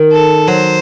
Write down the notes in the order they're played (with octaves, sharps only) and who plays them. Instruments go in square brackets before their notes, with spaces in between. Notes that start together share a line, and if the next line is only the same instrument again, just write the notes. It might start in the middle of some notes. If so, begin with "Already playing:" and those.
Already playing: [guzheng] D#3
[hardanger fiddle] A4
[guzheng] F#3 [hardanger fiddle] C5